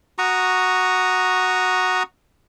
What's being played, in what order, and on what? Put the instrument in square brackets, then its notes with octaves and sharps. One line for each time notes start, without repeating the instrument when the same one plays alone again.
[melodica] F#4 A#5 C#6 D#6